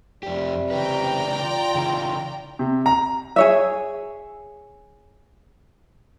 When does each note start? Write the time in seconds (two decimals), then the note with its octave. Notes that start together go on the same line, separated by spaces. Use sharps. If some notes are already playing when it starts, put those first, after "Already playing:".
0.23 F2 C3 G3 G4
0.71 C#3 E3 B4 D5 G5 A#5
1.40 F4
1.75 C#3 E3
2.59 C3
2.86 A#5
3.36 G#4 C#5 E5